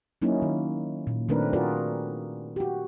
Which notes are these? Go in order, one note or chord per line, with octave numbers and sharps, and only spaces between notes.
F#3 A#3 C#4 D#4 E4
D#3
A#2
D#3 A3 C4 D4 A#4 B4
F4 F#4 G#4 A#4 B4 D5
F#4 G4